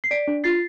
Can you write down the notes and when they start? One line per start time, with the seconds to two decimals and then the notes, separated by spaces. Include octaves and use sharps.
0.04 C7
0.11 D5 B6 D7
0.28 D4
0.44 F4 A6 C7